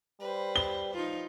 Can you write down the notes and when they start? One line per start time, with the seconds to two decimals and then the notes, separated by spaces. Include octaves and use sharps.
0.20 G3 B4 C5
0.56 G7
0.94 F3 D#4 F4